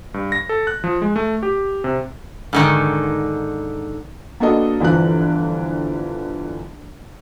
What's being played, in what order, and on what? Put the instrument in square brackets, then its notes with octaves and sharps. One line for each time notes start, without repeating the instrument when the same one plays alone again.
[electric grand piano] G2
A#6
A4
F#6
F3
G#3
A3
G4
C3
[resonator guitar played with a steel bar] G#2 D3 D#3
[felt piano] A#3 B3 D4 F#4 A4 D#5
G1 E3 F3 F#6